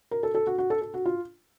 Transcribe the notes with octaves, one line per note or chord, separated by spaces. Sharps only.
A#4
A4
A4
F#4
F#4
A4
A4
F#4
F4